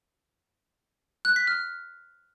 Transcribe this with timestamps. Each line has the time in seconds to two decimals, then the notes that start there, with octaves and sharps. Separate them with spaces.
1.25 F#6
1.36 B6
1.47 F6